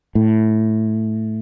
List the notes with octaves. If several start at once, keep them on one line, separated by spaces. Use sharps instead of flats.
A2